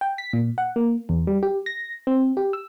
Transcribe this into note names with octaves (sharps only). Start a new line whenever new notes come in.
G5
B6
A#2
F#5
A#3
E2
G3
G4
A#6
C4
G4
E6